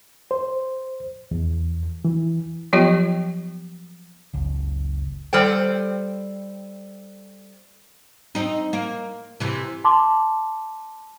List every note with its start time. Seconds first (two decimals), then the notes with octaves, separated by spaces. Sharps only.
0.31 C5
1.31 E2
2.05 E3
2.73 F3 F#3 B3 F4 G4 D#5
4.34 F#1 C#2
5.33 G3 A4 C5 G5
8.35 C4 D#4
8.73 A#3
9.40 C3 E3
9.84 A5 C6 D6